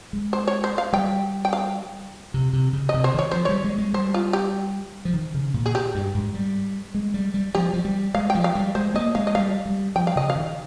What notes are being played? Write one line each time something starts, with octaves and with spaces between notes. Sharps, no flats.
G#3
C5
C#5
C5
F5
G3 G5
G5
F5
C3
C3
C#3
D#5
C3
C5
D#3 C#5
F3 C5
G3 C#5
G#3
G#3
G3 C5
F4
G4
F3
D#3
C#3
A#2
G#4
G4
G2
G#2
G3
G#3
G3
G3
F3 G4
F3
G3
G#3 F5
G5
F3
F5
G3
G#3 C5
A#3 D#5
G#3 F5
D#5
G3 F5
G3
F3 G5
F5
C#3 D#5
F5
D#3